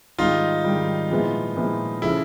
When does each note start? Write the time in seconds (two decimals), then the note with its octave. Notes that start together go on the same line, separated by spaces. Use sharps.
0.18 G#2 D#3 G3 D#4 F4
0.64 G#2 D#3 G3
1.10 A#2 F3 G#3 B3 E4
1.55 A#2 F3 G#3 B3 E4
2.02 C#3 F3 A3 C#4 E4